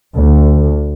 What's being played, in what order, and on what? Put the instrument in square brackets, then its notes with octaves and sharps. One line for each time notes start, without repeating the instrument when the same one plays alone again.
[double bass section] D2